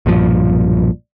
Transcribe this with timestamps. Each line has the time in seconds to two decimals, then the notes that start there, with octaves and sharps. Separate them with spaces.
0.06 B1 G2 A#2 F3